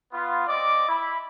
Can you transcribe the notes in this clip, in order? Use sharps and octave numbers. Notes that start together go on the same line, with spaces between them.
B3 F4
C4 D5 D#5 D6
E4 B5